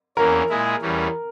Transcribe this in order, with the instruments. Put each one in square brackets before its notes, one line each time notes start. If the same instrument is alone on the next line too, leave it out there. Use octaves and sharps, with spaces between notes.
[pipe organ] E2 E3 A#3 C#4 [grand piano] A#4
[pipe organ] A#2 G#3 E4 G#4
E2 E3 G3 C#4